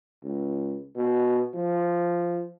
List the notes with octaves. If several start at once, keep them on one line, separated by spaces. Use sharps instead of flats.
C#2
B2
F3